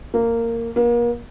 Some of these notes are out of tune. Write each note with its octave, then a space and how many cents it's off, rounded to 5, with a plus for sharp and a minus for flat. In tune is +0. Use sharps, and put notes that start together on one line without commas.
A#3 -15
A#3 +35